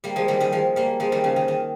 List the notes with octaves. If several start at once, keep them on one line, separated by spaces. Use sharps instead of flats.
G3 A#3
F3 G#3
D#3 G3
D#3 G3
F3 G#3
G3 A#3
F3 G#3
D#3 G3
C#3 F3
D#3
D#3